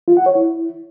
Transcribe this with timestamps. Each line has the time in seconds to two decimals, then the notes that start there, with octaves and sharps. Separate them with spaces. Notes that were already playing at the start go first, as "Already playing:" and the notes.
0.08 F4
0.17 F#5
0.26 C#5
0.35 E4